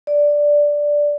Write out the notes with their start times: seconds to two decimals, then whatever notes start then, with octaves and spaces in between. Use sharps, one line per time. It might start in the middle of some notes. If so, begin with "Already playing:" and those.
0.07 D5